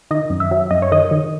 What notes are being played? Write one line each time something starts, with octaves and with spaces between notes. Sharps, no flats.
D#3 D#5
F#2
E5
F#3
F#2 D#5
C#5
D#3 D#5
D#3